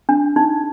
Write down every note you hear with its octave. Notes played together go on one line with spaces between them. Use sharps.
D4
D#4